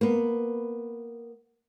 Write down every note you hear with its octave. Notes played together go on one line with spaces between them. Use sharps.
A#3 B3